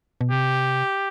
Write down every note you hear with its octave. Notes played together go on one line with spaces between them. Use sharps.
B2
C3 G4